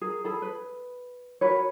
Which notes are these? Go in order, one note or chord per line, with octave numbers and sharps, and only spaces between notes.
G#4 A#4
G#4 A4 B5
B4
F#4 A#4 B4 C#5